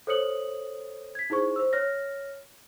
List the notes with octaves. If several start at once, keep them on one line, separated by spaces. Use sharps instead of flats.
A4 C5 C#5 D#6 C#7 F#7
G#6 B6
D#4 E4 G#4 C5 C#6
C5 E6
C#5 F6 A#6